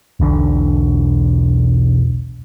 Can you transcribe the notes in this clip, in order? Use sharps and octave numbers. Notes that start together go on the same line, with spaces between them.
E1 B1 D3